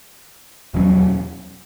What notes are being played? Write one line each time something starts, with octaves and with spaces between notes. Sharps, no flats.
E2 B2 F#3 C#4